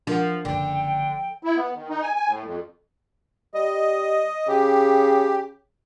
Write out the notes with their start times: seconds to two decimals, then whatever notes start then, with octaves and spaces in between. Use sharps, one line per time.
0.07 F3 D4 A#4 F#5
0.45 F#1 D3 G5
1.43 E4
1.57 B3
1.74 D#3
1.89 D#4
2.02 G#5
2.16 G#5
2.28 A2
2.43 F2
3.54 G3 D#5
4.48 C#3 G4